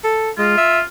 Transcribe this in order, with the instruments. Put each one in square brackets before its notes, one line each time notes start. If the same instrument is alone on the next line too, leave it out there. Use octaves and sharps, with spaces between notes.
[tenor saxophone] A4
[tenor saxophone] G#3 [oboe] F4
[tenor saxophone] E5